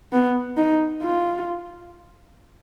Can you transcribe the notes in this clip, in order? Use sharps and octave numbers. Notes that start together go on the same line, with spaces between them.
B3
D#4
F4